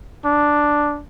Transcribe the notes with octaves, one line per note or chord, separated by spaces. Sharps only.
D4